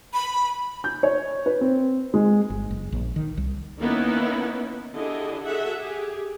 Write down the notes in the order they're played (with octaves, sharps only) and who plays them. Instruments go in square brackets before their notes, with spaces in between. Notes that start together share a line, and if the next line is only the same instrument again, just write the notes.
[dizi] B5
[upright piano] G6
C#5
B4
C4
G#3
[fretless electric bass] G1
F#1
A#1
D#3
C2
[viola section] D#3 A#3 B3 C#4 D#4 E4
D3 E4 G4 G#4 D#5
F#4 G#4 A4 E5 F#5
G4 G#4